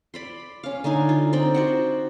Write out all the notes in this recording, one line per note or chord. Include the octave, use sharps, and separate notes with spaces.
D5 B5 C6
C#4 F5
D3 D#4 F5 G#5
F4
C4 D#4 D5 G5
F#4 C5 F#5